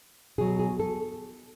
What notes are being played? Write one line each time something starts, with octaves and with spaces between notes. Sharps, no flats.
B2 F#3 G#4
G#4
A4